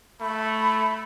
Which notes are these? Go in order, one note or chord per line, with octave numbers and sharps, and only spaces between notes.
A3 B5